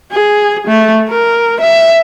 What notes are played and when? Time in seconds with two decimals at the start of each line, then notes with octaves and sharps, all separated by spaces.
0.11 G#4
0.67 A3
1.09 A#4
1.60 E5